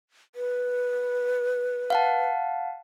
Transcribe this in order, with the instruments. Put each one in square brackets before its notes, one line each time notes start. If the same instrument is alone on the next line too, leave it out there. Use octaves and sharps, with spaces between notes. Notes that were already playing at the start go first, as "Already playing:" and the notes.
[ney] B4
[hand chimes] F5 F#5 A5